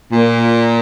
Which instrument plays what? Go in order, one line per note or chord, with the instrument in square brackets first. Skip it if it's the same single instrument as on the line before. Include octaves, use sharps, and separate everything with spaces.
[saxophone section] A#2